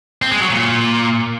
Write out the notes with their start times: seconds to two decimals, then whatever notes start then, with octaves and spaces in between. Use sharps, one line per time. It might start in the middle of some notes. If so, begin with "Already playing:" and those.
0.22 C4
0.31 G#3
0.41 F#3
0.50 A#2